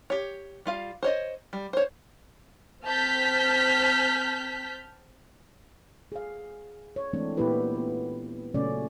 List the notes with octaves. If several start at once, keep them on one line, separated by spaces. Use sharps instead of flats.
G4 C#5
G3 F4 F5
C5 C#5 D#5
G3
C5 C#5
C4 A5 F6 G6 B6
G#4 F5
C#5
E3 G#3 A3 C4 D4
A#2 A#3 B3 E4 G4 B4
B3
A#2 C#3 F#3 A3 C#4 D5